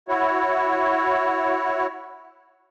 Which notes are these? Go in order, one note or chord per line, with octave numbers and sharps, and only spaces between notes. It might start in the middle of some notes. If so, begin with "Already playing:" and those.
E4 F#4 C#5